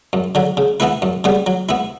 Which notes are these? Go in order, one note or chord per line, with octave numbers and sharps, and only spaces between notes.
F#2
D3 F#3
C#3
E3 B3 E4 B4
F#2
C#3 G3 B3
F#3
B3 E4